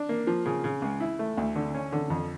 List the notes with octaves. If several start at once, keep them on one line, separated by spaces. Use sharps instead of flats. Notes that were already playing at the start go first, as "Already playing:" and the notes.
Already playing: D4
A#3
F3
C#3
C#3
C#2
E4
A3
D2
D3
C#4
D3
F2